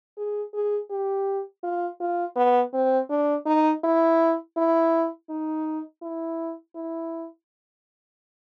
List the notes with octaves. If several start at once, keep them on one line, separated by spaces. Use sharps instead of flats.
G#4
G#4
G4
F4
F4
B3
C4
D4
D#4
E4
E4
D#4
E4
E4